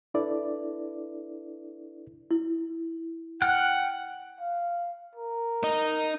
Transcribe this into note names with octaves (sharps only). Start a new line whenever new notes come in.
D4 E4 A4 B4 D5
E4
F#5 G5 F6 F#6
F5
A#4
D#4